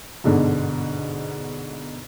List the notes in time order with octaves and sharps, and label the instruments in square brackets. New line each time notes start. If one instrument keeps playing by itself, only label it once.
[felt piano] G1 G#2 B2 D3